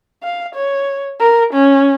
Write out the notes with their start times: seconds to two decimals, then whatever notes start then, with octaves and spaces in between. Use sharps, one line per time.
0.23 F5
0.55 C#5
1.20 A#4
1.54 C#4